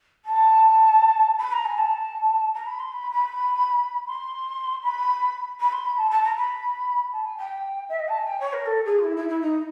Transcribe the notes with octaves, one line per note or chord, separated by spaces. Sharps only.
A5
B5
A#5
G#5
A5
A#5
B5
C6
B5
B5
C6
B5
B5
C6
B5
A5
A5
A#5
B5
A5
G#5
G5
E5
D#5
A5
G#5
G5
C#5
A#4
A4
G#4
F4
E4
E4
E4
D#4